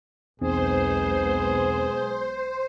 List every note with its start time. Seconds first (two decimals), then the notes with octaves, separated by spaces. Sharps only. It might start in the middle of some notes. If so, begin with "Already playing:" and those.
0.42 B1 E2 G#3 B3 C4 D#4 G#4 C5